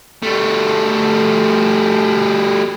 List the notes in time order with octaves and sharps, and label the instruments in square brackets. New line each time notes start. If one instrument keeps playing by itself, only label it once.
[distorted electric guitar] G3 A3